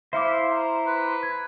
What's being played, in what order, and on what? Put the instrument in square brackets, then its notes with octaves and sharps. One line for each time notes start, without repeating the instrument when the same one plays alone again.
[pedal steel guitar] E4 C5 [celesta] E5 D6 [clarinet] F5
[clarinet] A#5
[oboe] B4
[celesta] G#6